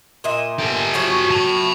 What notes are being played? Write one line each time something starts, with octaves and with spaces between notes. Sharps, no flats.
A#2 D#5 E5
G4 A4
F3 F#3 F#4
A5 B5